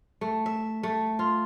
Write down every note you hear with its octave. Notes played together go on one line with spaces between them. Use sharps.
A3
E5
A3
F4